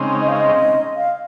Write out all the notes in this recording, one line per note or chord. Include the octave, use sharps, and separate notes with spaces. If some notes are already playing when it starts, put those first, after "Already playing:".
Already playing: C#3 G#3 C4 D#4
D#5
F5
D#5
F5